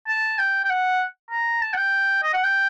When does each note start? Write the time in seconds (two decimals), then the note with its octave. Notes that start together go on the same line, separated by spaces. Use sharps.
0.07 A5
0.39 G5
0.64 G5
0.70 F#5
1.31 A#5
1.62 A5
1.73 F#5
1.77 G5
2.23 D#5
2.34 F#5
2.44 G5